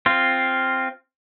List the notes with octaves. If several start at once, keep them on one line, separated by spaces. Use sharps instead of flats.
C4 F4